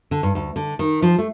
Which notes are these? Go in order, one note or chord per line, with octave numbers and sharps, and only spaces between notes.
D3
G2
D2
D3
D#3
F3
A3